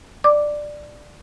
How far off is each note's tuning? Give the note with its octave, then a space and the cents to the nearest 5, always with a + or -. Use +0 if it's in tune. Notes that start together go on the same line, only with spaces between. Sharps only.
D5 +10 D6 +0